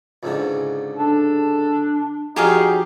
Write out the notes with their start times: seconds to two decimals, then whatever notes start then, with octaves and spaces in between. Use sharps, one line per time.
0.23 C#2 G#2 D3
0.97 D4 A4
2.36 F2 F#3 D#4 G4 G#4 F5